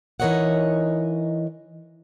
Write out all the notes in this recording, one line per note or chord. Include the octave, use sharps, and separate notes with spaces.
E3 D#4 A#4 C#5 D#5 F#5